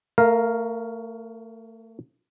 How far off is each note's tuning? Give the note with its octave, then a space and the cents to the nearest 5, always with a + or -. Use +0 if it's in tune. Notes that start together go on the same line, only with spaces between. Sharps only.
A3 +30 A#4 +0 F5 +0